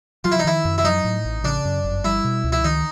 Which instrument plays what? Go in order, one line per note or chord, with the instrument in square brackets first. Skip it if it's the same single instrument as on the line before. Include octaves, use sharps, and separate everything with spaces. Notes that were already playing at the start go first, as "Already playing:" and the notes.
[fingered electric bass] F#3 [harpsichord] F4
[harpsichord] E4
D#4
[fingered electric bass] D#3 [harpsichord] E4
[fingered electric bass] F#2
[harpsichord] E4
[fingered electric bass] F#3 [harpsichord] D#4
[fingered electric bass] A2
A1
[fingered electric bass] C#3 [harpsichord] D4
[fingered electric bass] F#2
G1
[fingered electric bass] G3 [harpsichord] E4
[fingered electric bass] B2
C#2
[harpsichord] E4
[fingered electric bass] D#3 [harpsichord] D#4